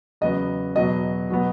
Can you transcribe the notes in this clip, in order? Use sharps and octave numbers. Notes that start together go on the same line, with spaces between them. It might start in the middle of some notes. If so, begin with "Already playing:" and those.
E2 C#3 F#3 B3 D#5
E2 B2 F#3 B3 D#5
B2 F#3 B3